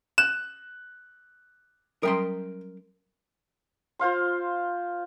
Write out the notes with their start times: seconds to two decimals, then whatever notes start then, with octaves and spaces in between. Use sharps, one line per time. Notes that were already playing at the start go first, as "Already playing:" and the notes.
0.18 F#6 E7
2.03 F#3 G3 C#4 A#4 G5 C6
3.99 F4 C5 F5 C6